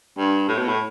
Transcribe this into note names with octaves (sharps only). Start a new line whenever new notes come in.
G2
A2
B2
A2